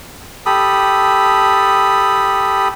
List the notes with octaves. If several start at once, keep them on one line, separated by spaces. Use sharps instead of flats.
G4 A4 B5 D#6